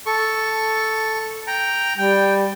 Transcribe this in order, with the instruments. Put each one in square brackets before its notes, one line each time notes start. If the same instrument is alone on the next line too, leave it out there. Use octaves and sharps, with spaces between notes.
[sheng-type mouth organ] A4 C#6
G5 A#5
[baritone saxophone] G3 [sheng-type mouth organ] G5